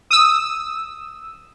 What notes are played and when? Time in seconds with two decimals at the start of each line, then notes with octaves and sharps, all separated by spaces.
0.11 D#6 E6